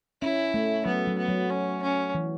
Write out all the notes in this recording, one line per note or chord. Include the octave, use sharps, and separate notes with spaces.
C#4 E4
A3
F#3 B3
F#3
B3
F#3
C#4
C#4
E3